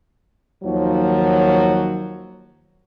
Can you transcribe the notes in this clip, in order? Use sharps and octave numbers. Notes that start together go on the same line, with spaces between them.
D#2 F3 F#3